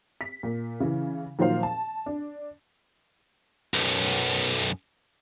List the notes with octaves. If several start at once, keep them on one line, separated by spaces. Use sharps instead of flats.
B6
A#2
C#3 E3
A#2 D#3 F3 F#3 C5 F5
A5
D4
B1 F#2